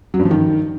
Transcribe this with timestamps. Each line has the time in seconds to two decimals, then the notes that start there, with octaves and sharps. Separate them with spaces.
0.14 F#3
0.19 G2
0.25 F3
0.31 D#3